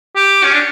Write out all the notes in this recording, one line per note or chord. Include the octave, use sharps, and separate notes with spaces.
G4
C#4
D4